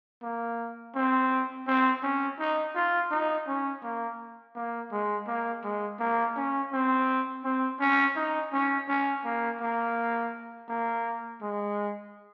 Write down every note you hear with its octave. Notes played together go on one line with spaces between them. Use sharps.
A#3
C4
C4
C#4
D#4
F4
D#4
C#4
A#3
A#3
G#3
A#3
G#3
A#3
C#4
C4
C4
C#4
D#4
C#4
C#4
A#3
A#3
A#3
G#3